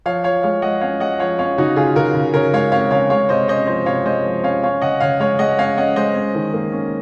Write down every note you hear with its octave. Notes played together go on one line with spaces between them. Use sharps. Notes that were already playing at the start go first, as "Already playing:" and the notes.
F3 C#5 F5
F3 C#5 F5
G#3 C#5 F5
G#3 D#5 F#5
C#4 C#5 F5
G#3 D#5 F#5
F3 C#5 F5
C#4 C#5 F5
C#3 D#4 F#4
C#3 F4 G#4
C#3 F#4 A#4
C#3
C#3 A#4 C#5
G#3 C#5 F5
C4 C#5 F5
C#3 C#5 F5
G#3 C#5 F5
C3 C5 D#5
C#4 C5 D#5
F3 C5 D#5
C3 C#5 F5
G#3 C5 D#5
F3
C#4 C#5 F5
C#4 C#5 F5
C#3 D#5 F#5
C#3 C#5 F5
G#3 C#5 F5
G#3 D#5 F#5
C#4 C#5 F5
C#4 D#5 F#5
G#3 C5 D#5
C#4
D#3
A#3
C#4